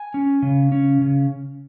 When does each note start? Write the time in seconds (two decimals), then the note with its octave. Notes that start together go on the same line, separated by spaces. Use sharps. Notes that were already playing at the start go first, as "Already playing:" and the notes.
Already playing: G#5
0.14 C#4
0.42 C#3
0.72 C#4
1.01 C#3